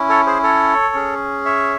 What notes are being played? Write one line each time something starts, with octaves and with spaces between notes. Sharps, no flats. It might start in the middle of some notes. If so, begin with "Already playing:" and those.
Already playing: C#4 E4
A4 C#5
G#4 C5
A4 C#5
C#4 G#4
C#5 E5